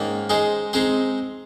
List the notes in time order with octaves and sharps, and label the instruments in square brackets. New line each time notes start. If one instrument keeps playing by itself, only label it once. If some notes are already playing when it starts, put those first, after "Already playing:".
Already playing: [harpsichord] G#2 D#3 A#3 [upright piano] C#4
[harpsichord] G#3 D#4 G#4 C5
[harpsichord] G#3 D#4 G#4 C5 [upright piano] C4